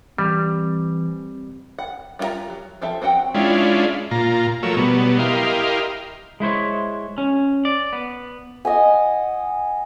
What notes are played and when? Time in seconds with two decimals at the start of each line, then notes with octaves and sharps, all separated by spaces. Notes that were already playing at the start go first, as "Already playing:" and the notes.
0.18 E3 G3 C4
1.79 F#5
2.19 G3 F4 F#4 E5 A#5
2.50 F#3
2.81 F3 C4 A4 E5
3.02 C4 F#4 F#5 G5
3.35 G#3 C#4 D4 E4 F4
4.11 A#2 F4 A#5
4.63 F3 F#3 A3 A#4 C#5 E6
4.77 B2 F#3 G3 B3
5.19 E4 G4 A#4 D#5 F5 C6
6.40 G#3 E4 C5 C#5
7.18 C#4
7.65 D5
7.93 B3
8.65 D#5 F#5 G#5